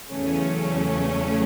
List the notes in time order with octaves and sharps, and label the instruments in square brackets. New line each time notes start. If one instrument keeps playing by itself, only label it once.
[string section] E2 C#3 F#3 A3 C#4